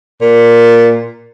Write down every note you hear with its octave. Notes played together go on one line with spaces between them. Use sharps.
A#2